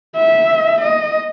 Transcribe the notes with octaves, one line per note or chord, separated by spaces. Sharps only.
E5
D#5